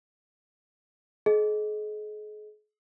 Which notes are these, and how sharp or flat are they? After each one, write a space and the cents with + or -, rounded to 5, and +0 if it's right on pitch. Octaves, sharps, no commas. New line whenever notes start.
G#4 +40 D#5 +0